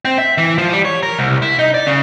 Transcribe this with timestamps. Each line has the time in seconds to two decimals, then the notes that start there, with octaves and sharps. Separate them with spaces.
0.05 C4
0.18 E5
0.38 E3
0.58 F3
0.73 G3
0.85 C#5
1.03 A#4
1.19 C2
1.42 E4
1.59 D#4
1.74 D5
1.86 C#3